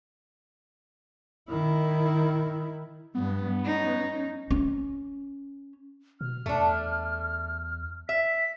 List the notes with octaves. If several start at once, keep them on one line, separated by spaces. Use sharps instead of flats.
D#3 E4
G2 B3
C#4 D#4
C#4
B2 F6
E2 A3 D4
E5 B6